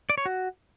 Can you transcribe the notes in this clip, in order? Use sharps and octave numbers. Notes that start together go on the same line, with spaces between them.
D5
C#5
F#4